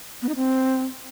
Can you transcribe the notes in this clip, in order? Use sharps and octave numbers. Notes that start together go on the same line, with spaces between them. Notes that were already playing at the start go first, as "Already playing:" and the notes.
B3
D#4
C4